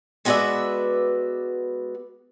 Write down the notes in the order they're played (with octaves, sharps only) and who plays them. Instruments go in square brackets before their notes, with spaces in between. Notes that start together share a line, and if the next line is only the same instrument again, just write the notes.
[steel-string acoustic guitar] G#3 B3 F#4 B4 D5 E5